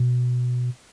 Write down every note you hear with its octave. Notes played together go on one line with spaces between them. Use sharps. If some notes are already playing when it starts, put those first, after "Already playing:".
Already playing: B2